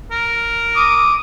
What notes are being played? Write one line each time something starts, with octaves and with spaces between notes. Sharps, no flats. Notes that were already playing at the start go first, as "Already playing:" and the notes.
A#4
D6 D#6